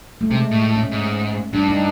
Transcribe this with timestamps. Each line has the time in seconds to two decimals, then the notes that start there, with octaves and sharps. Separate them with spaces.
0.21 A3
0.30 C3 G#3
0.51 A2
0.76 C#4
0.92 G#2
1.53 G2 D4
1.68 D#4